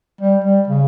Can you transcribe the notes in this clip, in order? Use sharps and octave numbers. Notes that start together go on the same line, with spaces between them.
G3
G3
C#3